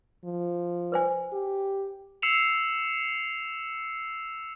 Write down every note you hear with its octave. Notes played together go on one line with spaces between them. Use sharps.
F3
B4 C5 G#5
G4
E6 C7 C#7 E7 F7